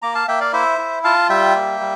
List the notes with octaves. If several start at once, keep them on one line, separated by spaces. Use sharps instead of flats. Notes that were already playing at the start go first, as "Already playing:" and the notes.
A#3 A#5 D6
F5 A5
A#3 E5 G5
D5 F5
E4 C5 E5
E4
F4 F5 A5
G3 E5 G5
A#3
G3